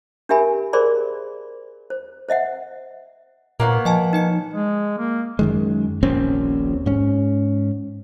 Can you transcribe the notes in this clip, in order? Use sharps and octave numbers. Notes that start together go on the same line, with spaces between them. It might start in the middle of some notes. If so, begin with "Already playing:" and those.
D4 G4 A#4 E5 G#5 B5
G#4 A#4 C5 D5 B5 C6
C5
C5 D#5 E5 F#5
A#2 A#3 B3 C#5
F3 D#5 G#5 A5
D#4 D#5 C#7
G#3
A#3
F#2 D#3 G#3
D#1 A#1 C4 C#4
G#2 C#4